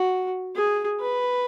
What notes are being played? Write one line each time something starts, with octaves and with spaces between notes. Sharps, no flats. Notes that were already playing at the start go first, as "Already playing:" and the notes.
Already playing: F#4
G#4
B4